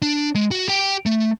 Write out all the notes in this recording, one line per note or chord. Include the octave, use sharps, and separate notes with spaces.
D4
G#3
F#4
G4 G5
A3